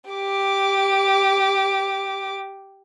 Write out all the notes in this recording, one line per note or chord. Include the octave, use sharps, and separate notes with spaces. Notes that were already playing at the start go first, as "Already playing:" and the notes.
G4 D6